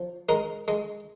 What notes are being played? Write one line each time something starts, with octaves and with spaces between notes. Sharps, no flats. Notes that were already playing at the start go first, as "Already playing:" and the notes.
Already playing: F3
G#3 A#4
G#3